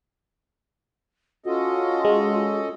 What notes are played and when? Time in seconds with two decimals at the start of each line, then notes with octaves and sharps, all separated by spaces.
1.46 C#4 F4 F#4 A4 D#5
2.05 G#3